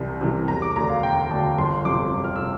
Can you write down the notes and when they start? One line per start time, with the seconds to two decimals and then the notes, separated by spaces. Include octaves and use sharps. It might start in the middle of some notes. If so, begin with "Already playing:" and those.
Already playing: C2 C3 E3 G3
0.21 C3 E3 G3
0.48 E1 A#5
0.62 D6
0.76 D2 D3 A#5
0.90 F5
1.03 E1 G5
1.30 D2 D3 A5
1.58 G1 C6
1.85 F2 C3 D6
2.12 G1
2.24 F6
2.36 C3 E6